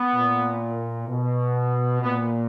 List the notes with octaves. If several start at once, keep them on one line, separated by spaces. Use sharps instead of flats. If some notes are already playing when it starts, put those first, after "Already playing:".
Already playing: B3
A#2
B2
A#2 B3